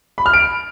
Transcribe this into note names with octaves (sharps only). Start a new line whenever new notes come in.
B5
F6
D7